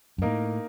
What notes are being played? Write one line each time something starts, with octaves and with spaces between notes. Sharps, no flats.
F#2
A2 A#3 D#4 A#4 D#5